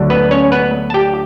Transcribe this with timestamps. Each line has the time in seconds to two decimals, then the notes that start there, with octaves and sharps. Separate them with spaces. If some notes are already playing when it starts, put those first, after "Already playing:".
Already playing: D2 D3 F#3 D4
0.10 B3 B4
0.31 C#4 C#5
0.52 B3 B4
0.90 A5
0.94 G4 G5